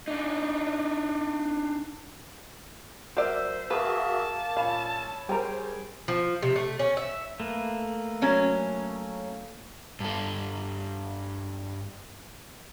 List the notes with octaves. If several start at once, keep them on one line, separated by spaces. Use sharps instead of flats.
D4 D#4
F#3 A#4 C5 D5 E5
A#3 F#4 G#4 B4 E5 A5
A#2 C#4 F5 B5
G3 G#4 A#4 C5 G5 A#5
F3
C3
A3
C#4
E5
A3 A#3 B4
F#3 C#4
G2 A4